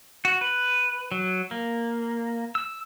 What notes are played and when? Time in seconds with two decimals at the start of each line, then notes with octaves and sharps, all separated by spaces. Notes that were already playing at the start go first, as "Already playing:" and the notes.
0.25 F#4
0.41 B4
1.12 F#3
1.51 A#3
2.55 E6